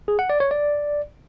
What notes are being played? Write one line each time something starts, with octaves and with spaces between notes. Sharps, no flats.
G#4
F#5
D5
C#5
D5